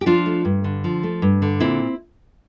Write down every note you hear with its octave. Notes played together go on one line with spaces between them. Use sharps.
G4
F3 D4 F4
A3
G2
D3
F3
A3
G2
D3
A#2 C4 E4